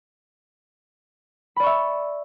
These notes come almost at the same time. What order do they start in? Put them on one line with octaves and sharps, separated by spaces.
B5 D5 C#6 E5